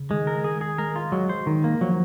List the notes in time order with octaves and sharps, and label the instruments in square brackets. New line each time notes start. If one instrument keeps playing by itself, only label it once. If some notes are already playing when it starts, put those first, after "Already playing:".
Already playing: [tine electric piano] C#3
[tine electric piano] D#3 [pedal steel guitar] G#3
[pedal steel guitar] A#4
G#4
G#4
[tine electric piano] G#3 [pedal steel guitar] A#4
[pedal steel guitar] F4
[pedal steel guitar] F#3 [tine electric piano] G#3
[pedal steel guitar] C5
D#3
A#3
[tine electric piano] F3 [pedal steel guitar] F#3